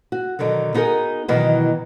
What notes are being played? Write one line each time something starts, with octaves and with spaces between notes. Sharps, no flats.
F#4
B2 D3 D#3 F#3
B3 D#4 F#4 G#4 A#4
B2 D#3 E3 F#3 B3